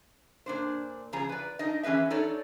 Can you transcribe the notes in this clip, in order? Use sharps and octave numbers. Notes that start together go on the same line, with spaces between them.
A#2 D4 C5
C#3 F3 G#4 A#5
B4 D5
D4 D#4 D#5
E3 C#4 G#4 B4 E5
D#4 A4 C#5 D5